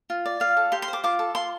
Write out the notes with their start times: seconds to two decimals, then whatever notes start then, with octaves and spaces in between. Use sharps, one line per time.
0.10 F4
0.26 D5
0.40 F4 F5
0.57 A4
0.72 G4 C6
0.82 C6
0.88 C5 D6
1.04 F4 D6
1.19 A4
1.35 F4 C6